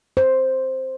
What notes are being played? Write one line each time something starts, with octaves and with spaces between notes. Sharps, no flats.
C5